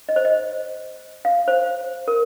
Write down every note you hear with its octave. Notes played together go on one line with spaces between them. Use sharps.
D#5
C5
D#5
F5
C5
A#4